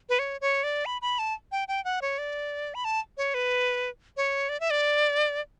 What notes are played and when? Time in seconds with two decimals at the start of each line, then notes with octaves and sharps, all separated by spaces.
0.09 B4
0.19 C#5
0.41 C#5
0.64 D5
0.86 B5
1.02 B5
1.19 A5
1.52 G5
1.68 G5
1.85 F#5
2.02 C#5
2.18 D5
2.74 B5
2.85 A5
3.17 C#5
3.34 B4
4.17 C#5
4.49 D5
4.60 E5
4.70 D5